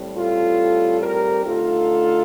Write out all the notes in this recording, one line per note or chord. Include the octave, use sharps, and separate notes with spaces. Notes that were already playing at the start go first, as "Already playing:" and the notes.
Already playing: A2 G3 C4
F4 A4
G4 A#4
D3 A3 D#4 F4 A4